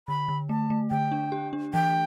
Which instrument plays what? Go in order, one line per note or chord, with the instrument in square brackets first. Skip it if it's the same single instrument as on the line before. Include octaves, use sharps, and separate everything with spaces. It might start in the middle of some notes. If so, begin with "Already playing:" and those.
[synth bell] D3 [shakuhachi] B5
[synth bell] D3
[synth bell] A3 [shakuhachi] A5
[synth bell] A3
[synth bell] D3 [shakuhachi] G5
[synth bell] D4
G4
D4
[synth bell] E3 [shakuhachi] G5